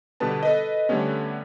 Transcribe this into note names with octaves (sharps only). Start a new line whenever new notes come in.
B2 D3 G3 B3 B4 A5
A4 B4 D#5
D3 G3 A3 B3 C#4